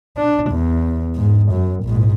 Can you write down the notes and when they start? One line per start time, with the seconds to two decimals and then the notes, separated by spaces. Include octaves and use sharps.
0.17 D4
0.51 E2
1.16 G#2
1.52 F#2
1.84 A#1 G#2